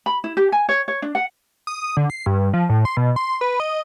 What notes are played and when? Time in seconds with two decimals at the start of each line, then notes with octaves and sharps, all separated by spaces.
0.06 B5
0.24 E4
0.37 G4
0.52 G#5
0.69 C#5
0.88 C#5
1.02 D4
1.15 F#5
1.67 D#6
1.97 D3
2.10 C7
2.26 G2
2.54 F3
2.69 A2
2.85 C6
2.97 B2
3.16 C6
3.41 B4
3.60 D#5